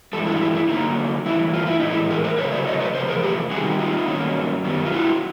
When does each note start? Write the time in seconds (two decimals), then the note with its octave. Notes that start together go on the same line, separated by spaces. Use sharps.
0.13 G2 E3 G#3 A4
0.27 E4 F#4
0.36 D#4
0.41 E4
0.55 E4
0.69 D3 F#3 A#3 D#4
1.25 G2 E3 A3 E4
1.54 F4
1.66 E4
1.80 A2 E3 G#3 D#4
1.92 E4
2.10 G#4 A#4
2.24 A#4 C5
2.38 C#3 F#3 A3 B4 C#5
2.52 C5 D5
2.67 C#5 D#5
2.80 B4 C#5
2.95 E2 C3 F3 C5
3.08 G#4 A#4
3.23 G4 A4
3.51 D#3 G3 C4 D#4 F#4 G#4
3.79 D#4 F4
4.07 G2 D#3 F#3 A#3 C#4
4.64 F#2 D#3 G3 B3
4.85 F4
4.92 E4 F#4